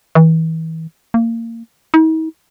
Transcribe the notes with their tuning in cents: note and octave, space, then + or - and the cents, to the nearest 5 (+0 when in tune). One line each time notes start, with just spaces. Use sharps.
E3 -35
A#3 -25
D#4 +45